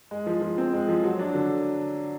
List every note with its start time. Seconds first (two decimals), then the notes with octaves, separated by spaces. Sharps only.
0.11 G#3
0.26 F3
0.42 F3
0.58 C4
0.73 G#3
0.89 F3
1.03 F#3
1.19 D4
1.35 D3